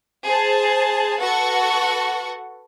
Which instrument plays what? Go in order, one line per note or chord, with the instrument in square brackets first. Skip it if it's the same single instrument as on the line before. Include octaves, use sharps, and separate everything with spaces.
[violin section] G#4 C5 A5
F#4 A4 B4 F#5 C#6